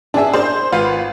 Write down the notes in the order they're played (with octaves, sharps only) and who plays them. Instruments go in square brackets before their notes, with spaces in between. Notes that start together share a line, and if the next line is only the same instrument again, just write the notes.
[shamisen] E3 B3 E5 [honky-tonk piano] D4 G#4
[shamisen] G#4 A#4 D5 [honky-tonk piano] C5
[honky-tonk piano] G#1 [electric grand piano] F4 B4 F5 [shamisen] F#5